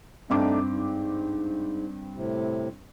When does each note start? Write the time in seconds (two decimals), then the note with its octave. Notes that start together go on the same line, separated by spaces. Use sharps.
0.30 G2 A3 C4 D4 D#4 D6
0.69 G#2
2.14 A2 C3